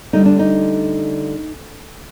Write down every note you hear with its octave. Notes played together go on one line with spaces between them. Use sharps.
D2 D3 G3 D#4
D4
D#4